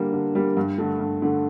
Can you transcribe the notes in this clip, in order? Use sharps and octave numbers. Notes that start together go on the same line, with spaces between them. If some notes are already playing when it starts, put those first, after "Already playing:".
Already playing: D3 G3 A#3
D3
G3 A#3
G2
D3 A3
G2
D3 A3